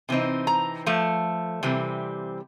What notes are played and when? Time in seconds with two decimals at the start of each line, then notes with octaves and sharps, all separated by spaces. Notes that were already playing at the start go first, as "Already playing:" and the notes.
0.09 C3 E3 C4 D#4
0.47 A#5
0.86 F3 A3
1.63 C3 E3 G3 C4